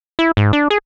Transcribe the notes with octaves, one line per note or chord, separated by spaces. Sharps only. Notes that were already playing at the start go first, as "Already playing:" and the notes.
E4
G#2
D4
G#4